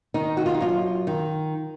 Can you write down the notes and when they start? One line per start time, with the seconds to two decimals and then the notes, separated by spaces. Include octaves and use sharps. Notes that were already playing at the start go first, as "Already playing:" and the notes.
0.14 D#3 D#4
0.37 F#4
0.46 F4
0.54 D#4
0.60 F#2 F4
1.07 D#3